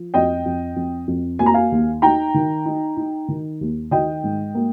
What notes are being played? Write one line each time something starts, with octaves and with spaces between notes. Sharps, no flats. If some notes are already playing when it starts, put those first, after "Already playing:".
Already playing: F3
F2 D#5 G5
F2
F2
F2
A#3 G#5
A#5
F5 G#5
D#2
D#4 G5 A#5
D#3
D#4
D#4
D#3
D#2
D#3 D#5 G5
G#2
A#3